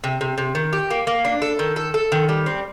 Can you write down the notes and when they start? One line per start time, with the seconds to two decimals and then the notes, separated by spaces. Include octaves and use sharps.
0.04 C3
0.21 C3
0.38 C3
0.55 D#3
0.73 G4
0.91 A#3
1.07 A#3
1.25 D4
1.42 A4
1.59 D#3
1.76 A4
1.94 A4
2.12 D#3
2.29 G3
2.46 C4